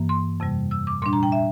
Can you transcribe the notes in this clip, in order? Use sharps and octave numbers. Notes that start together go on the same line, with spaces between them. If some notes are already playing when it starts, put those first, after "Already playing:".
Already playing: G2 E3 A#3
C6
F2 C3 G3
E6
D6
A#2 G3 D4 C6
A#5
G5
E5